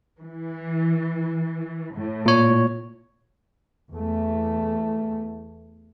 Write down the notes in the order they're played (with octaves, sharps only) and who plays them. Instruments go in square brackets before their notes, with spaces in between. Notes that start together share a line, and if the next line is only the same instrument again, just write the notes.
[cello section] E3
A2
[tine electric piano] A#2 C#5
[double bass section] E2 A3